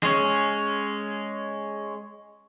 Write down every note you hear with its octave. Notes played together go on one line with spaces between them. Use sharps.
G#3 C#4